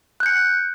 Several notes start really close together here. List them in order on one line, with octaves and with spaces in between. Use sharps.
F#6 G6 C#7